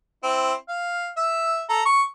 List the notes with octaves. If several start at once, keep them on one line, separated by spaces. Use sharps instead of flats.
C4 E4
F5
E5
A4 A#5
C#6